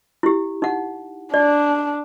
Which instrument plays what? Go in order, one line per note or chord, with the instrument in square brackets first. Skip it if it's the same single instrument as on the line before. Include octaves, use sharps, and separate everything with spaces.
[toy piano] E4 G4
D#4 F#5
[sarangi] D4 [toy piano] D5